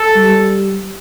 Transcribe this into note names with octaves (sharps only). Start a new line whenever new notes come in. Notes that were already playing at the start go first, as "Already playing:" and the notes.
Already playing: A4
G3